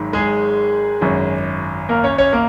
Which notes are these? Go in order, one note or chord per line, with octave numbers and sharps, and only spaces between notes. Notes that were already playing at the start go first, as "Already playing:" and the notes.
Already playing: G#1 G#2 D#3 F#3
G#3 G#4
G#1 F#2 F#3
A#3 A#4
C#4 C#5
C#4 C#5
A#3 A#4